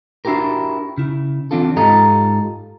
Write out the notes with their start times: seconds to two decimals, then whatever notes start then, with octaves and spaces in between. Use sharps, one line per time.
0.25 D4 E4 F#4 G4 A#4
0.98 C#3 E4
1.51 E3 F#3 C4 D4 F4 A4
1.77 G#2 F4 G4 A4 D#5 A#5